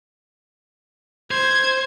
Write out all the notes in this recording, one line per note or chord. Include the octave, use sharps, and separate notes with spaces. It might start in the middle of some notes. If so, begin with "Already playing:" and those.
C5 G#6